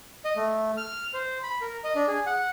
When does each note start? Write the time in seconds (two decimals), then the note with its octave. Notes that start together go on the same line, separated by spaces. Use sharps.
0.25 D#5
0.36 A3
0.77 F6
1.14 C5
1.43 B5
1.61 A#4
1.84 D#5
1.95 D4
2.08 G#4
2.26 F#5